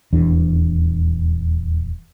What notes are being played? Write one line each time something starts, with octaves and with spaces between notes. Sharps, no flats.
D#1 E2 E3 D4